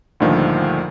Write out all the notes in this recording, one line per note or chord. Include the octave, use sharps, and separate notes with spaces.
D2 G2 A#2 D3 D#3 F3